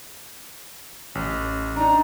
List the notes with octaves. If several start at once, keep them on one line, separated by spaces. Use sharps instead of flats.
A1
D4 D#4 A#5